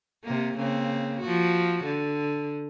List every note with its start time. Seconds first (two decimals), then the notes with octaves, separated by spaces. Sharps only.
0.24 C3 A#3
0.57 C#3 A#3 C4
1.21 F3 F#4
1.85 D3